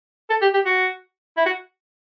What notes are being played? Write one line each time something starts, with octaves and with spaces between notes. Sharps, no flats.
A4
G4
G4
F#4
E4
F#4